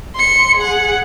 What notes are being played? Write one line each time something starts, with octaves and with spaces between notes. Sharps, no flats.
C6 C#7
G#4 F#5